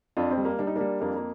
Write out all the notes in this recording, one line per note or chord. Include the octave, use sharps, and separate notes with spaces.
F2 D4 F4
C4
G3
A#3
G3 D4
D#4
G3 A#3 D4
F2 A#3 D4
A#3